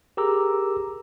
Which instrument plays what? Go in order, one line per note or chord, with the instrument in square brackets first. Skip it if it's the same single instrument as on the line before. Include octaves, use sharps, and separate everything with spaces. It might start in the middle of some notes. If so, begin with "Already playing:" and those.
[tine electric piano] G4 G#4 A#4 A#5 D6 E6